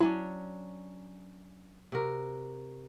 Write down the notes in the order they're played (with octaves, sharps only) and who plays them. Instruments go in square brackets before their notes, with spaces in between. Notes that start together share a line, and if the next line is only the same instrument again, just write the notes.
[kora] F#3 C#4 D4 [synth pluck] E4
[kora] C3 F#4 A#4